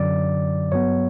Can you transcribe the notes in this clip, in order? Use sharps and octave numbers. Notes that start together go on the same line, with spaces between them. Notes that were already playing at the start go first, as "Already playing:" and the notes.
Already playing: F#2 D3 F#3 D5
G2 F#3 B3 C#5